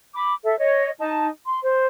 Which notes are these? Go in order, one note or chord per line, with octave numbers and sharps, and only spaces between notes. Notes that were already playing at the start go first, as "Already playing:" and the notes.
B5 D6
A4 E5
C#5 D#5
D#4 A5
C6
C5